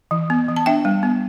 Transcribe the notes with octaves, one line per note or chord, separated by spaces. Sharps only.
E3
B3
E3
A5
D4 E5 G5
G3
B3